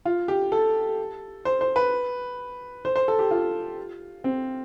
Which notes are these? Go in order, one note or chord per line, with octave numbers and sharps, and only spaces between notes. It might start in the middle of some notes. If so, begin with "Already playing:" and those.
F4
G4
A4
C5
C5
B4
C5
C5
A4
G4
F4
C4